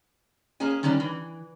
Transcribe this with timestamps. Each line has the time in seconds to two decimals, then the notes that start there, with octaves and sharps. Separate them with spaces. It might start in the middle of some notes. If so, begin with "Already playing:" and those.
0.60 A#3 C#4 G#4 G#5
0.83 D#3 G3 C#4 D4 A#5
1.00 E3